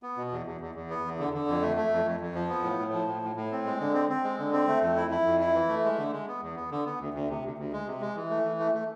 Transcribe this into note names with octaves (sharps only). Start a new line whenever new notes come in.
B3
B2
E2
E2
E2
E2
B3
E2
D3
D3
F2
A3
A3
F2
F2
F2
F3
B3
A2
A2
F3
A2
A2
A2
C4
G#3
D3
C4
C4
G#3
D3
C4
A3
F2
E4
E4
F2
E4
E3
A3
G#3
D3
G#3
B3
E2
B3
D3
B3
D2
D2
C3
D2
D2
G#3
C3
G#3
E3
A3
E3
A3
A3